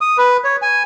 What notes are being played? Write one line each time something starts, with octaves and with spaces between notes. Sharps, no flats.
D#6
B4
C#5
G#5